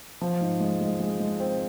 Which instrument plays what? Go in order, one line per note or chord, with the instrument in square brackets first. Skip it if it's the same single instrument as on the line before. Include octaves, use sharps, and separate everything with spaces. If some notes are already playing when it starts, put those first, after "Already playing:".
[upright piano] F3
G#2
G#3
G#3
G#3
G#3
C4